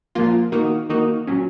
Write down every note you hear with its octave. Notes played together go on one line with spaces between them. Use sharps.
A#2 F3 A#3 F4
D#3 A#3 D#4 F#4
D#3 A#3 D#4 F#4
A#2 F#3 C#4